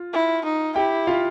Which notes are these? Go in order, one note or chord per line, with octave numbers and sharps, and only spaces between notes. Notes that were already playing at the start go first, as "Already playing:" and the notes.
Already playing: F4
E4
D#4
E4 G4 G5
F4 F5